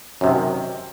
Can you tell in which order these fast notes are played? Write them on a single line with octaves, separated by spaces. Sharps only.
F#2 C3 D#3